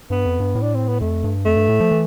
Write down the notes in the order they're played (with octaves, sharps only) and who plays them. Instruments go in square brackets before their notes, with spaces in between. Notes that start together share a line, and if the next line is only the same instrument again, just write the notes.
[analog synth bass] G2 [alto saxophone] B3
[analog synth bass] F2
G2
A2
[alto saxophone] D4
C4
B3
[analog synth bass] F2 [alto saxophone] A3
[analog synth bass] G2
[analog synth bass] F2 [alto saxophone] A3
[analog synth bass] G2
A2
F3
E3